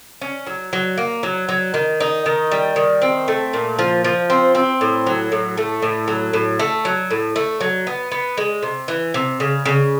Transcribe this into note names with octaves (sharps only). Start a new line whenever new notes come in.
C#4
F#3
F#3
A#3
F#3
F#3
D#3
D#4
D#3
G3
D#3
C4
A3
A#2
F3
F3
C4
C4
A2
F#3
A2
A3
A2
F#3
A2
A3
F#3
A2
A3
F#3
B3
B3
G#3
C3
E3
C3
C#3
C#3